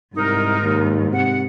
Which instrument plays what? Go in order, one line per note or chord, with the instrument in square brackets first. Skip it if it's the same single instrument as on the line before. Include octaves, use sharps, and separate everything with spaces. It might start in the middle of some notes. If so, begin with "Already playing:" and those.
[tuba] C2 [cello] G#2 [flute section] D#4 A#4
[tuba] D#2
[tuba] C3 [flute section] F#5